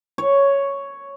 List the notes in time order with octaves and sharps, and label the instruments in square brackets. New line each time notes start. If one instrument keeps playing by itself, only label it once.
[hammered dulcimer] C#5